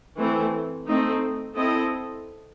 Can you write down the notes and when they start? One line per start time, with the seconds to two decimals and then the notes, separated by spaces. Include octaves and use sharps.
0.16 E3 A3 C4
0.86 A3 C4 D#4
1.56 C4 E4 A4 D#5